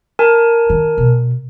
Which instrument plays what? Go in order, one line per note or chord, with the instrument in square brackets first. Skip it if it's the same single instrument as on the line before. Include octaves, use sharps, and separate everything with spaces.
[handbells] A#4 G#5 A5
[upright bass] D#3
B2